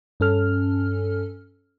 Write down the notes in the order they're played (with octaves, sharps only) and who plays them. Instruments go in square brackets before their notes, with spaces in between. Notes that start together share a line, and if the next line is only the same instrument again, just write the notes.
[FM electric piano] G2 C#4 A4 F6